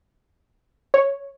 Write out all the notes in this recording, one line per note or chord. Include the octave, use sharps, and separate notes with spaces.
C#5